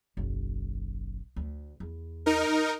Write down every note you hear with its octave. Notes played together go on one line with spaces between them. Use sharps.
F#1 B1
D2
E2
D#4 A#4